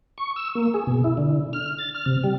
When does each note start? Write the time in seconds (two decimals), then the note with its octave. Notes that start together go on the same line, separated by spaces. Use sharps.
0.18 C#6
0.36 E6
0.55 A#3
0.74 G#4
0.87 B2
1.04 E4
1.17 D3
1.53 F6
1.78 A6
1.95 F6
2.06 C3
2.24 G3